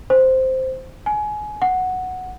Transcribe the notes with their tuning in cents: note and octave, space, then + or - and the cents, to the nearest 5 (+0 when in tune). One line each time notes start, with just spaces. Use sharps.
C5 -5
G#5 +20
F#5 -5